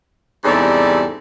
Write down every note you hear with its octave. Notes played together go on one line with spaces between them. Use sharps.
E2 G#2 C3 G3 A4 D5